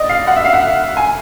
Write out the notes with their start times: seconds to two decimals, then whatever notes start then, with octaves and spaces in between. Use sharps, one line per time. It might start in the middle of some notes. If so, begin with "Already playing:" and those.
Already playing: D5 D#5
0.09 F5
0.27 F#5
0.36 E5
0.45 F5
0.53 F#5
0.97 G#5